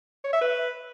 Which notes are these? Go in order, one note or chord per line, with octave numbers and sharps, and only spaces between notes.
C#5
E5
B4